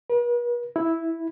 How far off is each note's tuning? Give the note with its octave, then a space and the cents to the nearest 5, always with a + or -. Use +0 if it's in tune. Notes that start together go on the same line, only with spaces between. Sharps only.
B4 -45
E4 -5